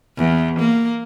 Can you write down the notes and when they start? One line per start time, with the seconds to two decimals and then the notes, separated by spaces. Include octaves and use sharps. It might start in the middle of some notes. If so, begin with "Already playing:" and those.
0.17 E2
0.59 A#3